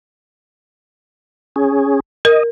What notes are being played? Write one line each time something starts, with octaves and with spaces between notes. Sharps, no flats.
C#4 G#4
A#4 D#5